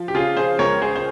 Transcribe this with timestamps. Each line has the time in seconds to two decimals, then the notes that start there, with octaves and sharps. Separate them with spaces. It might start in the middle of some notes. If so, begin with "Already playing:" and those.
Already playing: F3
0.08 G4
0.14 C#3 F4 G#4
0.37 G#4 C5
0.59 C#2 A#4 C#5
0.82 G#4 C5
0.96 C5